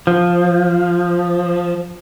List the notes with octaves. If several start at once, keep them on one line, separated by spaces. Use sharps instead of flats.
F3